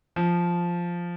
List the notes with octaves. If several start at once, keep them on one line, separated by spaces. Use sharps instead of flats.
F3